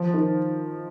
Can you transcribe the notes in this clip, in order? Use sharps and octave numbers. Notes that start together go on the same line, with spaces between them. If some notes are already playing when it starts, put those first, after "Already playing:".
Already playing: F3
D#3